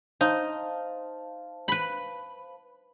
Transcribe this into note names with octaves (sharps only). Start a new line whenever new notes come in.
D#4 C5 F5 A5
B4 B5